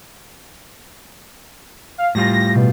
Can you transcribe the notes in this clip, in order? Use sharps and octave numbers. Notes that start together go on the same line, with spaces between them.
F5
A2 G3 F4 A#6
B2